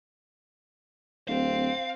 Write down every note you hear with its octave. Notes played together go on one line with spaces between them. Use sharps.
D1 C4 F5